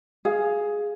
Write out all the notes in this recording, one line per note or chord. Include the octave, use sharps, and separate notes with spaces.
G#4 F5